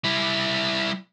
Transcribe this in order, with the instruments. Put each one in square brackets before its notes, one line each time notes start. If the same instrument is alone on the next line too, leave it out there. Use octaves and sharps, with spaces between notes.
[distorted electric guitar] G3 E4